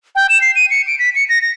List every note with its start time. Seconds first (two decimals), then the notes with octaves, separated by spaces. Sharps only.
0.15 G5
0.29 E7
0.41 C7
0.56 D#7
0.71 C#7
0.87 D7
0.99 B6
1.15 C#7
1.29 A#6
1.42 A#6